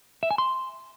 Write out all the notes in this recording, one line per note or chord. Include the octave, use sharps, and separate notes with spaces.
E5
G#5
C6